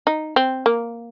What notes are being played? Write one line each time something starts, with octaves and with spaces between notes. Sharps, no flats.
D#4
C4
A#3